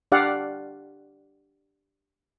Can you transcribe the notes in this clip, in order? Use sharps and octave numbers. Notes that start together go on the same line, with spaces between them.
D4 G4 D5 F5 F#5